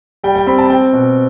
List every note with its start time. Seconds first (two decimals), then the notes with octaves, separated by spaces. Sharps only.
0.24 G3 G5
0.35 G5
0.47 C4 B5
0.58 A5
0.70 C4 G5
0.93 B2